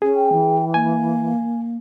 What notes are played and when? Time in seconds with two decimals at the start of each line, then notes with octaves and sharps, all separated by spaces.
0.02 C#4 G#4
0.15 G5
0.32 E3
0.74 A#3 G#5